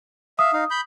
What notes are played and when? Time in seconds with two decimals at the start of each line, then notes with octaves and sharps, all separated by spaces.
0.39 E5 F5 D#6
0.53 D#4 F5
0.71 B5 G6